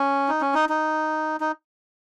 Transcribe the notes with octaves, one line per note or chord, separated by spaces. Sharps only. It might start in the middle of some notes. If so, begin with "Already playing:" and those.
Already playing: C#4
D#4
C#4
D#4
D#4
D#4